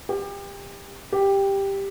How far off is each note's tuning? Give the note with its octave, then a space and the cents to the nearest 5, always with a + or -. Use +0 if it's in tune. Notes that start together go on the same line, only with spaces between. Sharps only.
G4 +30
G4 +5